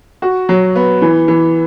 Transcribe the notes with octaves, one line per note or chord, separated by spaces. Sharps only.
F#4
F#3
B3
E3
E3